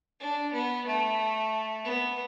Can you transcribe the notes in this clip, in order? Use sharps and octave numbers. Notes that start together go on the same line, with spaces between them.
D4
B3
A3
B3